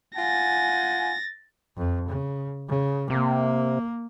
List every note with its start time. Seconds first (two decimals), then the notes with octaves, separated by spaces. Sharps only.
0.16 F4 F#5 G#5 A6 A#6
1.77 F2
2.08 C#3
2.68 C#3
3.10 C3 A#3